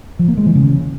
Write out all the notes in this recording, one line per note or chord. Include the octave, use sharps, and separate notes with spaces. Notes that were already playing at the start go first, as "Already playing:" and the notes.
F3
A#3
G#3
E3
C#3